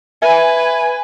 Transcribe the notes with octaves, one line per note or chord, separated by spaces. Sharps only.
B4 E5 G#5